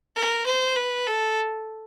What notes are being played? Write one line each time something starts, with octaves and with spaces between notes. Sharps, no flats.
A#4
C5
B4
A4